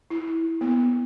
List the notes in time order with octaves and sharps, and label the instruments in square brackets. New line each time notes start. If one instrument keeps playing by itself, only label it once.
[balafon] E4
B3